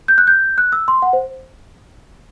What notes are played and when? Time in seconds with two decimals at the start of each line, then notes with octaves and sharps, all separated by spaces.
0.08 G6
0.18 F#6
0.27 G6
0.58 F#6
0.72 E6
0.88 C6
1.02 F#5
1.13 C5